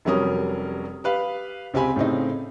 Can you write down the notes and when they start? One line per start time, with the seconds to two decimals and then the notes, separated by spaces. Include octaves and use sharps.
0.05 F1 F#3 G3 C#4 A#4 D#6
1.04 G4 B4 F5
1.74 C#2 C4 G4 G#5 B5
1.96 A2 C#3 C4 D#4